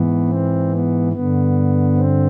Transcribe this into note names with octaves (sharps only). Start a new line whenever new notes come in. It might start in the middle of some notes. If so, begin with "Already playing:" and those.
Already playing: G#2 E3 B3
C4
B3
G2 D3 B3
C4